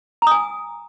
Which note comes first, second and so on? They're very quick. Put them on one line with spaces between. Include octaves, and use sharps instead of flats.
A#5 D#6 G#5